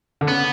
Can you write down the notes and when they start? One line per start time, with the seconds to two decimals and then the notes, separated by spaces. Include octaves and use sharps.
0.21 D3
0.28 C#3 B3